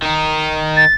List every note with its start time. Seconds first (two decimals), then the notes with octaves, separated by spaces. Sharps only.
0.02 D#3 D#4
0.77 A6